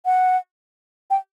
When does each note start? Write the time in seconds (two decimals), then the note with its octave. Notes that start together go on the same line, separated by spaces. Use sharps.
0.05 F#5
1.10 G5